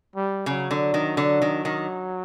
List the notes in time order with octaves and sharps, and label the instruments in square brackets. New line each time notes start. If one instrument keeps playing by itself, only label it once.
[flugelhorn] G3
[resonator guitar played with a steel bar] C#3 [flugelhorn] F#3
[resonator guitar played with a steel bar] D3
D#3
D3
D#3
D#3